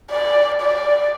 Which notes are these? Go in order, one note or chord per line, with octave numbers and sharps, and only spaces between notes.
D5
D5